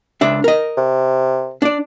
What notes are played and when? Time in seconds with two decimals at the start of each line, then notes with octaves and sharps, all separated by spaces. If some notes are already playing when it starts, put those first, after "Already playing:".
0.21 C#2 D4 E5
0.44 A#4 D#5
0.77 C3
1.62 D4 D5